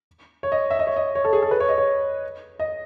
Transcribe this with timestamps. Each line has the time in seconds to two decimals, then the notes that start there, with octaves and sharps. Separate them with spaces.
0.43 C#5
0.52 D#5
0.71 E5
0.79 D#5
0.87 C#5
0.97 D#5
1.15 C#5
1.25 A4
1.33 G#4
1.42 A4
1.51 B4
1.60 C#5
1.69 D#5
1.78 C#5
2.60 D#5